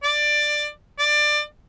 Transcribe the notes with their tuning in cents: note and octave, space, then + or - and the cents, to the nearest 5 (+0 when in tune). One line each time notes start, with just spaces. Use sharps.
D5 +15
D5 +20